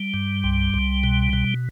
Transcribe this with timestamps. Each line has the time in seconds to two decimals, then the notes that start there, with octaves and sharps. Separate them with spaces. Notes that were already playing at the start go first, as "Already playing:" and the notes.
Already playing: G3
0.14 G2
0.44 C2
0.74 C2
1.03 B2
1.33 B2